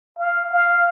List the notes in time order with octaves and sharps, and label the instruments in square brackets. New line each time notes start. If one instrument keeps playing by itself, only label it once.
[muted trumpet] F5
F5